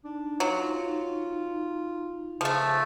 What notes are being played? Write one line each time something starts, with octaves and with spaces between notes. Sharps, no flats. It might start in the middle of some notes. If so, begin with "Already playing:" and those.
D4 D#4
F#3 F4
C#3 F3 A3